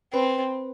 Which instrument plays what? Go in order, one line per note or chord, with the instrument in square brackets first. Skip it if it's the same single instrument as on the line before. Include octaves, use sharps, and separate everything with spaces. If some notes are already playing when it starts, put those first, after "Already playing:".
[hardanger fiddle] C4 [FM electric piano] B4